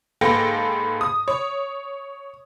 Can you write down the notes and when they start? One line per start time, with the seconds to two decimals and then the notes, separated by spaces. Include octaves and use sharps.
0.21 G#2 A#3 A4 B4 G5 A#6
1.01 D#6
1.28 C#5